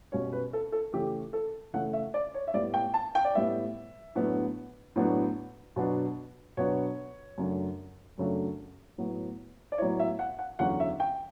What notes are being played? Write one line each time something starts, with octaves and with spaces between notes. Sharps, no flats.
B2 G3 C#4 C#5
B4
A4
A4
C#3 E3 A3 G4
A4
C#3 E3 A3 F#5
E5
D5
C#5
E5
A2 G3 B3 D5
G5
A5
G5
D5
A2 G3 B3 E5
A2 F#3 B3 D4
A2 F#3 B3 D4
B2 F#3 B3 D4
B2 F#3 B3 D4 C#5
F#2 C#3 F#3 A3 D4
F#2 C#3 F#3 A3 D4
A2 F#3 B3 E4
D5
A2 F#3 B3 E4 C#5
E5
F#5
F#5
E2 D3 F#3 C#4 F#5
E5
G5